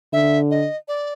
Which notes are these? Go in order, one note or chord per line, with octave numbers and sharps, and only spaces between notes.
D3 E5
D#5
D5